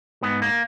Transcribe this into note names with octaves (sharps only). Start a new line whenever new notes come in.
G#2 B3
A#3